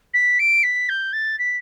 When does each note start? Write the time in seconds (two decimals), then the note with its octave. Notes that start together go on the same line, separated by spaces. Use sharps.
0.14 B6
0.39 D7
0.63 B6
0.89 G6
1.13 A6
1.39 B6